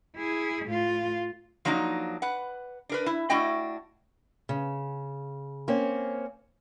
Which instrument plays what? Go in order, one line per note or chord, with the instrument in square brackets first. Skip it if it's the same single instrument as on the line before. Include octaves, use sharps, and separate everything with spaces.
[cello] E4 G#4
A2 F4
[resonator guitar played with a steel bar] F3 F#3 A#3 D4 D#4
B4 F#5
D4 A#4 B4
E4
A3 D4 E4 F#4 D#5 G5
[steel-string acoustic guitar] C#3
A#3 C4 C#4